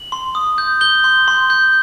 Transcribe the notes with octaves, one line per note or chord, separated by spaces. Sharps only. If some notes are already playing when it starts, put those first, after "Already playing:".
Already playing: F#7
C6
D#6
G6
G6 G7
C6
C6
G6